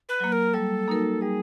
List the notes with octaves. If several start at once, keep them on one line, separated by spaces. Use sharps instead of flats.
B4
F#3 A#3
A#4
G3 A4
A#3 D#4 F#4 A#4
G3 G#4